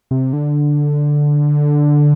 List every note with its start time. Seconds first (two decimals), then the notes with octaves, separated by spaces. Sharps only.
0.11 C3
0.33 D3